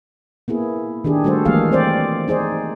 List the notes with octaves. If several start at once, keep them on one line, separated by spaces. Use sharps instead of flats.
A#3 B3 E4 G#4
D#3 D4 G4 G#4
G3 A3 F#4 A4 C5
E3 F#3 G#3 A#3 G#4 F5
C4 C5 D5
D#4 G#4 C5 D5